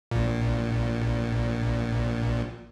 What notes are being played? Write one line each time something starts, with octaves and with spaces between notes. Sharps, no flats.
A#1 A#2